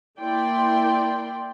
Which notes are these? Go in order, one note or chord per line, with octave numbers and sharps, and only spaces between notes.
A#3 E4 D5 G5 C6